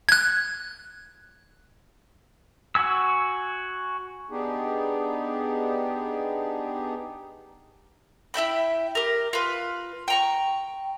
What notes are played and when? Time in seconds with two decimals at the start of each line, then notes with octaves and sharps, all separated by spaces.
0.09 F#6 G#6
2.75 F#4 G#5 E6
4.30 B3 D4 D#4 G4 G#4
8.34 E4 E5 G5 B5
8.95 G4 A#4
9.33 F4 B4
10.08 G5 A#5 C#6